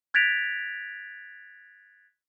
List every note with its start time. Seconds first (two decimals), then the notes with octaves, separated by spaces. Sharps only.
0.14 F#6 G#6 A6 B6 D7 F7